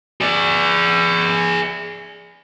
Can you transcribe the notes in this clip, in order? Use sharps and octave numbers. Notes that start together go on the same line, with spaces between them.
G#4 D5